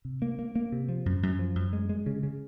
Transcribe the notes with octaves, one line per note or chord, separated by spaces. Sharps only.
C3
A#3
A#3
A#3
C3
F3
F#2
F#2
F3
F#2
G#3
G#3
C#3
C#3